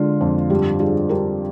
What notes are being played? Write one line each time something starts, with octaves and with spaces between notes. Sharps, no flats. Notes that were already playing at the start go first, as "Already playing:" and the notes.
Already playing: D3 G#3 F4
F2
G2 G4
G2 F4 G#4
G2 G4 A#4